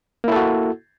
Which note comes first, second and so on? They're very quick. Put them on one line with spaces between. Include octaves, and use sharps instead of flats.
A#3 E4 A4 F#4